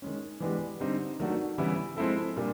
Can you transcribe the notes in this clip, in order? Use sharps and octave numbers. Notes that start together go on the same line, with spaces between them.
D#3 G#3 C#4
E3 G#3 B3 D4 G4
D3 G3 C4 D#4
D#3 F#3 A3 D4 F#4
C#3 E3 G3 B3 E4
F3 G#3 C4 E4 A4
A#2 G3 A#3 D4